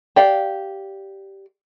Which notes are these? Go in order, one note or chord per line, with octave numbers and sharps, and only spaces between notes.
G4 D5 F5